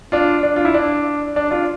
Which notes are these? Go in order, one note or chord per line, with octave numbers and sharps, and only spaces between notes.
D4 F4
D4
F4
E4
D4
D4
D4 F4